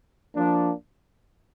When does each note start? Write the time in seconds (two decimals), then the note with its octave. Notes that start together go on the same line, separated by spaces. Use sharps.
0.36 F3 A#3 D4